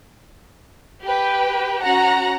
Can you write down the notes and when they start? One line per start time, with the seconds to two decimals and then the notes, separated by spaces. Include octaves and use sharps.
1.04 G4 B4 G5
1.83 C#4 F#4 F#5 A#5